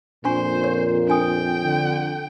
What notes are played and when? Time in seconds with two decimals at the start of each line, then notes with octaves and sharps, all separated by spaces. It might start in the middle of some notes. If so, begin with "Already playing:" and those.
0.25 F2 A#2 D4 C5 G#5 C#6
0.62 G4 C#5
1.08 D4 G5 G#5 D#6
1.64 D3